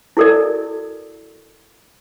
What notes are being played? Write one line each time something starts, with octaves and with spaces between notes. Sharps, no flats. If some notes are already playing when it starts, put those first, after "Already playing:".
E4 F#4 A4 A#4 D5